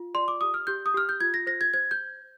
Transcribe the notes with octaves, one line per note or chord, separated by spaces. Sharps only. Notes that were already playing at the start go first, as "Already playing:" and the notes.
Already playing: F4
D5 C6
D6
G4 D#6
F6
G4 G6
D#6
G4 F6
G6
F4 G#6
A#6
C5 A#6
G#6
C5 G#6
G6